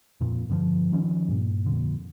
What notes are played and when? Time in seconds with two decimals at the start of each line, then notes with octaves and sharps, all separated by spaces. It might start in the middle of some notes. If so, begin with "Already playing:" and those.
0.21 F2 A#2
0.49 G2 D3 D#3 F3
0.92 D#3 F3 C#4
1.28 G2 A#2
1.66 F2 A#2 D3